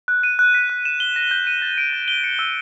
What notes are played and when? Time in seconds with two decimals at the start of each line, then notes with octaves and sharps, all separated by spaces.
0.08 F#6
0.23 D#7
0.39 F#6
0.54 B6
0.70 F#6
0.85 E7
1.00 G7
1.16 A#6
1.31 G6
1.47 D#7
1.62 A6
1.78 D7
1.93 A6
2.08 G7
2.24 C#7
2.39 E6